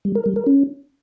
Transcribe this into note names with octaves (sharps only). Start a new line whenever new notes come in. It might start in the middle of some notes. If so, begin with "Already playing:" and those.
G3
A#4
G3
A#4
C#4